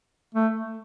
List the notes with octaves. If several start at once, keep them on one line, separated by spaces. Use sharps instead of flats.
A3